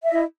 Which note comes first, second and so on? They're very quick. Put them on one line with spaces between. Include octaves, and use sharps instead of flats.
E5 D#5 E4